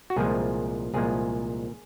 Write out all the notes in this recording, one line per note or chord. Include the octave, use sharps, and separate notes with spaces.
F#4
C2 A#2 F3 G#3 G#4
C2 A#2 F3 G#3 G#4